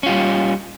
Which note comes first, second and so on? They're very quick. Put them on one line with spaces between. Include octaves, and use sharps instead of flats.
C#4 F4 G3